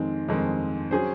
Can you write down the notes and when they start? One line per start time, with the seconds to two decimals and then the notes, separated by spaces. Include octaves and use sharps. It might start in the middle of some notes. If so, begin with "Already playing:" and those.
Already playing: F2 D#3 G#3 C4
0.29 F2 D#3 G#3 C4
0.91 F#3 C#4 G#4 C5